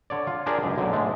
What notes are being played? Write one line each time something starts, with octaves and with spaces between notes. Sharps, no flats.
D3 C#5 D5
F4
D4 G4 G#4 A#4 D5
C#2 F#2
B1 D3 F#3
G#2 G#3 A3